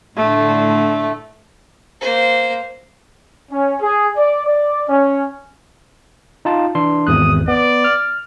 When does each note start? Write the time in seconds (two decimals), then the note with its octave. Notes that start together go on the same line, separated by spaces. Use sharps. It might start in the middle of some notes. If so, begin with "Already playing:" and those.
0.17 A2 D3 A3
2.01 A#3 C5
3.51 C#4
3.81 G#4
4.17 D5
4.46 D5
4.89 C#4
6.45 D#4 F4 A5
6.75 E3 D4 C6
7.07 G#1 E2 D#6 F#6
7.48 B3 D5
7.84 F6